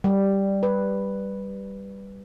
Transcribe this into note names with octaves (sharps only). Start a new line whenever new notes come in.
G3
B4